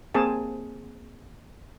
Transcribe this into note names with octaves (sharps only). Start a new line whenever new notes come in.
A#3 C4 G#4 G#5 A5